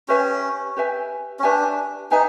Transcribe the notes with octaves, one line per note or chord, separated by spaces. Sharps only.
C#4 G4 B4 E5 G#5
G4 B4 E5 G#5
C#4
D4 G4 B4 E5 G#5
D#4 G4 B4 E5 G#5